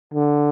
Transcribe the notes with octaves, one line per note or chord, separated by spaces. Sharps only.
D3